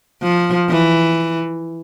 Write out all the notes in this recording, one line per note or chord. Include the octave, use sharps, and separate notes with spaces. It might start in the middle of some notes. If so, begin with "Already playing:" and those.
F3
E3